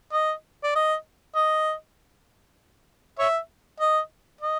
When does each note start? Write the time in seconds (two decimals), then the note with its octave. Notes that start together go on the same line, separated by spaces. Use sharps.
0.13 D#5
0.63 D5
0.75 D#5
1.35 D#5
3.19 C#5 E5
3.80 D#5
4.41 D#5